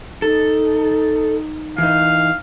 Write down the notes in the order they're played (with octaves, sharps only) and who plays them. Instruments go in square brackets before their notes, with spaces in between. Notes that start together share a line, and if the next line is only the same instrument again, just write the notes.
[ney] D#4 [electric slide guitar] A4
[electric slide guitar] E3 D#4 [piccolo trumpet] F5